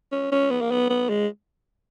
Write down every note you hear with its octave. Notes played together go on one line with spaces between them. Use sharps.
C#4
C#4
B3
A#3
B3
B3
G#3